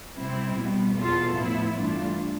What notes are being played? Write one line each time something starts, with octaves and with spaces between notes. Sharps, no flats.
C3 G3 C4 E4
B2 G3 B3
E2 B2 B3 F4 A4
A2 F3 B3 E4
G2 E3 A3 D4 F4